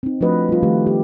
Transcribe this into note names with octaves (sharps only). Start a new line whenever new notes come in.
C4 D#4
F3 A3 D4 F#4 B4 D#5
G3 F4
D#3 F3 A3 G4 B4
G4